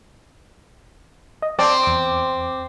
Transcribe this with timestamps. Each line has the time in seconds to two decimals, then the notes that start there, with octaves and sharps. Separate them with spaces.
1.42 D#5
1.59 C4 D5 A5 D6
1.83 E2 D6